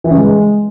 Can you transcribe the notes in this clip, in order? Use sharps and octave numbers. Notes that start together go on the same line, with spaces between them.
E3
C#3
G#3